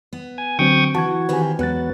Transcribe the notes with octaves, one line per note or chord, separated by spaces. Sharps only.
B3
G#5
D3 F#3 C4 G5 C#6 D#6
E3 F#4 A5 C#6 G#6
D#3 C4 G4 B4 G#5
E2 F#3 G#3 B3 F#6 A6